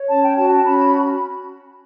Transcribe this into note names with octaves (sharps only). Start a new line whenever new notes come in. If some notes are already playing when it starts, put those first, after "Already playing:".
Already playing: C#5
C#4 A5
G5
F#4 A5
A5
C#4 B5